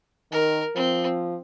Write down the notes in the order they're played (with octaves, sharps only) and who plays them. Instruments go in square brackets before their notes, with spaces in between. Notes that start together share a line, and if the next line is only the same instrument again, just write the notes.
[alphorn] D#3 [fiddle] A#4
[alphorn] F3 [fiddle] C4